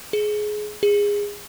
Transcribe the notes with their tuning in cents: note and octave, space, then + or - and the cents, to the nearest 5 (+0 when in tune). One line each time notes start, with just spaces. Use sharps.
G#4 +20
G#4 -20